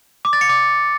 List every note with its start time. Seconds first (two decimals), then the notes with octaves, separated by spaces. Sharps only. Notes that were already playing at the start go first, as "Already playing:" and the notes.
0.25 D6
0.33 A6
0.41 C#7
0.49 D6